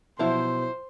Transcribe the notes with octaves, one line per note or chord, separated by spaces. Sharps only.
B2 F3 F#3 E4 C5